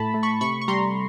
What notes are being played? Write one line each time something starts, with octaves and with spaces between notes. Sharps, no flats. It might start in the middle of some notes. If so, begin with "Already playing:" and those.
Already playing: A2 A3 A5 B5
A3
B5 C#6
C3 B5 C#6
C#6
G3 A#5 C6